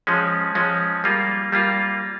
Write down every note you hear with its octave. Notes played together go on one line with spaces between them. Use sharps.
F3 G#3 C#4
F3 G#3 C#4
G3 A#3 F4
G3 A#3 F4